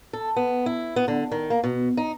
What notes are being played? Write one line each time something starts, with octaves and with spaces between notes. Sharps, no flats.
A4
B3
E4
B3
D3
D#3
A#3
B2
D#4